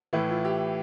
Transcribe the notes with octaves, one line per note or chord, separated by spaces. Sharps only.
A2 E3 E4
F4
G4